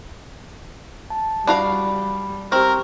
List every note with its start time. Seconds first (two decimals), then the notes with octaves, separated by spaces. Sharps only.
1.10 A5
1.47 G3 D4 F#4 F5 B5
2.52 C4 G4 A#4 C#6